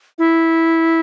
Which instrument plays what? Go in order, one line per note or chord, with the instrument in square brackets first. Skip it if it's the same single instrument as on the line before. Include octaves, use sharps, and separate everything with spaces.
[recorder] E4